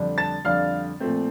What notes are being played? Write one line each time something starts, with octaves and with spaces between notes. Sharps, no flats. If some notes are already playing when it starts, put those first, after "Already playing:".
Already playing: F2 D3 G3 D4
A5 A6
F2 D3 G3 D4 F5 F6
A#2 F3 A3 C4